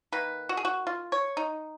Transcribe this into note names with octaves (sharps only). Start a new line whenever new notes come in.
D#3 A#3 B4
F#4
G#4
F#4
F4
C#5
D#4